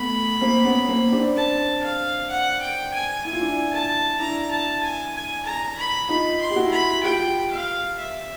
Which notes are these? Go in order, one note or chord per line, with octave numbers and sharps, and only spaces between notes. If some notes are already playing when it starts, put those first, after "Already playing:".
Already playing: A3 B3 B5
A#3 C4
B3 C#4
A#3 C4
C4 D4
A5
F5
F#5
G5
G#5
E4 G#5
F4
D4 E4
A5
D4 E4 A#5
A5
G#5
G#5
A#5
B5
D#4 F4 B5
C6
G4
E4 F#4
B5
F4 G4 G5
F5
E5